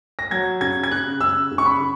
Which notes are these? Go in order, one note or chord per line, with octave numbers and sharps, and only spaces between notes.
A#6
F#3 G#6
C#3 G#6
G#6
C#3 F#6
C#3 E6
C#3
C#6
B5
C#3